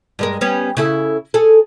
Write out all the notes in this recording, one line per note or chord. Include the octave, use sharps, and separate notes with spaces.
G2 G#3 A#4
G3 B3 C#4
C#3 E4 A4
G#4 A4